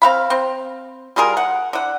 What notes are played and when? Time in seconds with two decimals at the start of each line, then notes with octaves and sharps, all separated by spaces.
0.02 C4 F5 B5
0.30 C4
1.16 G3 F4 G#4 A#4
1.37 F#5
1.73 D3 F#5